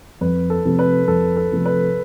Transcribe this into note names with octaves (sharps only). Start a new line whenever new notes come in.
F2 B4
A4
C3 F3 A3
B4
F2 A4
A4
C3 F3 A3
B4